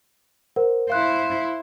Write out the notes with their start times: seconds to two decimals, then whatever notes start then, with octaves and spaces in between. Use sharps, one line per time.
0.56 A#4 C5 F#5
0.90 E4 C5 F5 F#6